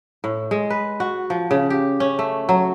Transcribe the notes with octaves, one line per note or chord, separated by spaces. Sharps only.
A2
G#3
B4
F#4
F3
C#3
G4
C#4
A3
F#3